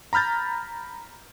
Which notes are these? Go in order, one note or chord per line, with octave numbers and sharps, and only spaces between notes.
A#5 B5 F6 G6 A6